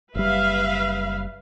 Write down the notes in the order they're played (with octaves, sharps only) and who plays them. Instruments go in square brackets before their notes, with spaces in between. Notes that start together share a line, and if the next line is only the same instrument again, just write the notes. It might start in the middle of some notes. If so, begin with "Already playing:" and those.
[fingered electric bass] F#1 G3 [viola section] B4 E5 F5